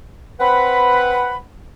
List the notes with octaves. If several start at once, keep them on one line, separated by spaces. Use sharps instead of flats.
C4 B4 F#5 B5